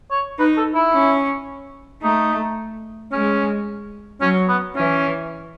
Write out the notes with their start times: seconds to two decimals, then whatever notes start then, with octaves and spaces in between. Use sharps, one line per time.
0.11 C#5
0.39 D#4 B4
0.58 A4
0.75 E4
0.93 C#4
2.02 A3 D#4
3.12 G#3 C#4
4.21 F#3 C#4
4.48 B3
4.76 E3 C#4